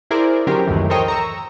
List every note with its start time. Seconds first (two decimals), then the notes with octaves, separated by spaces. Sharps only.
0.11 E4 G#4 A#4 C5 D5
0.47 D3 F#3 C#4 G4 A#4 C5
0.67 C#2 F#2 A2 D#3 E3
0.90 A4 A#4 C5 C#5 D#5 G5
1.08 A#5 C#6 E6